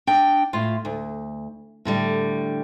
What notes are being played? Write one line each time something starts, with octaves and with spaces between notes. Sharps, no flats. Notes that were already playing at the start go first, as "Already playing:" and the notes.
D4 G5
A2 F4
D2
A2 D3 G3